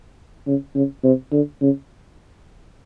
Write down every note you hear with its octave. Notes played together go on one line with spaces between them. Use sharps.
C#3
C#3
C3
D3
C#3